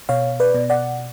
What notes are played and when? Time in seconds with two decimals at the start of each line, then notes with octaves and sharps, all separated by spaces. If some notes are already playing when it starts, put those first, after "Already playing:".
0.09 B2 C#5 F5
0.40 B4 D5
0.55 B2
0.70 D5 F#5